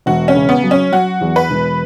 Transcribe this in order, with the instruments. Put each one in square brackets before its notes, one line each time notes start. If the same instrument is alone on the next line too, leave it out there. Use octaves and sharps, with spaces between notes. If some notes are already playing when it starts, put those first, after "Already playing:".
[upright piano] E1 [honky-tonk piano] F#4
[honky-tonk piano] C#4
[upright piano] C#3
[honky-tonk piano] B3
[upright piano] F#3
[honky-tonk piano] C#4
[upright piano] F#3 [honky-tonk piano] F#4
[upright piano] E2
[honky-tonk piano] B4
[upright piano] E1